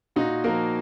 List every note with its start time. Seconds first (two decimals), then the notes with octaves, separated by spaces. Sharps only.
0.16 A#2 D#4 F#4
0.44 F3 A#3 F#4 A#4